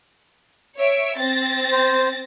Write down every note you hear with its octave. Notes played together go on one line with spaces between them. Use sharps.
C#5 E5 D7
C4 A6 A#6
C5